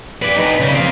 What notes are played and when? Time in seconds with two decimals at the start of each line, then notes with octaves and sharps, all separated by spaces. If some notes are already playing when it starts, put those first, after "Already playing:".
0.22 B4 D5
0.36 D#4 B4
0.60 C#3
0.74 C4 F5